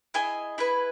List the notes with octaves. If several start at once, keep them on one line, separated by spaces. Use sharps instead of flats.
E4 G#4 D#5 G#5
E4 G#4 B4